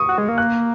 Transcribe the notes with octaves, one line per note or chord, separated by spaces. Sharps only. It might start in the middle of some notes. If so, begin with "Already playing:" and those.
Already playing: C#6 D#6
F#4
G#3
A#3
F#6